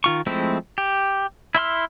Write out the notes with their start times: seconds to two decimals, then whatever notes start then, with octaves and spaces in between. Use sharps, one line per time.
0.04 D#3 F4 C#6
0.26 F3 G#3 A3 C4 E4
0.78 G4
1.55 E4 E5 C6 F6